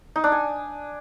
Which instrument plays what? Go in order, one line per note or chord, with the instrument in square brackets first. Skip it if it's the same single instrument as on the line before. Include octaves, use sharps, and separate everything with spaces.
[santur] D#4
D4
G#5